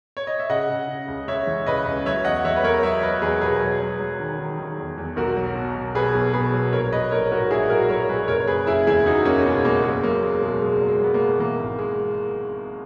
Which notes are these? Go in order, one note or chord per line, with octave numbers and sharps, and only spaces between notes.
C#5
D#5
E5
C#3 D#5 F#5
C#3
C#3
C#2
C#2 C#5 E5
E3
C#2 B4 D#5
C#2
F#3 C#5 E5
E2 D#5 F#5
E2 C#5 E5
B4
E2 A#4 C#5
F#3 C#5 E5
F#3 B4 D#5
E2 G#4 B4
B2 G#4 B4
F#3
F#3
F#3
D#3
D#3
D#3
E2
E2
B1 F#4 A#4
F#3
B2
B2
B2 G#4 B4
B1
B2 G#4 B4
F#3
A#1 A#4 C#5
A#1 B4 D#5
A#1 A#4 C#5
G#2 F#4 A#4
A#1 E4 G#4
F#3 F#4 A#4
F#3 A#4 C#5
F#3 G#4 B4
F#1 A#4 C#5
F#1 G#4 B4
F#1 E4 G#4
E2 E4 G#4
F#1 D#4 F#4
E2 A#3 C#4
B2 G#3 B3
F#1 A#3
E2 G#3
F#3 A#3
E2 G#3
B2 G#3
F#3 G#3
F#3
G#3
F#3 B3
A#3
B2
E3 A#3
G#1
G#3